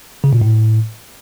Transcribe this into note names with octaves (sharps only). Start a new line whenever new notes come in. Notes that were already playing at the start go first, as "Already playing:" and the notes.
C#3
A#2
A2